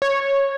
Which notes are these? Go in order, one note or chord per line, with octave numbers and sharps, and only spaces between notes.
C#5